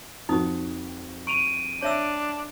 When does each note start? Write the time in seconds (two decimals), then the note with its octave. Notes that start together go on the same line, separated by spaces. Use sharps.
0.29 F2 D#4 F#4 D#6
1.27 C#6 D7 D#7 F7
1.82 D4 C#5 E5 E6